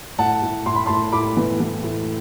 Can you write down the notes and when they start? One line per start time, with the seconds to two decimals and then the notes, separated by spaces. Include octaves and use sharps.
0.18 A2 F#5 A5
0.42 A2
0.66 A2 C6
0.76 B5
0.86 A2 A5 C6
1.12 A2 B5 D6
1.37 E3
1.60 E3
1.84 A2